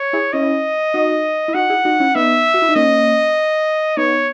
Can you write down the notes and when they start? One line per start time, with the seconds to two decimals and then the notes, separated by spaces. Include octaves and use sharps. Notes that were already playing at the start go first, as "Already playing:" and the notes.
Already playing: C#5
0.13 E4 G#4
0.33 C#4 E4 D#5
0.94 D#4 F#4
1.48 E4
1.54 D#4 F#4 F#5
1.70 E4 G#4
1.85 D#4 F#4
2.00 C#4 E4
2.15 B3 D#4 E5
2.54 F#4
2.62 E4
2.69 D#4
2.75 A#3 C#4 D#5
3.97 B3 D#4 C#5